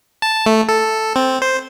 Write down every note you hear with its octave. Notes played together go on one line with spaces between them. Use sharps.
A5
A3
A4
C4
C5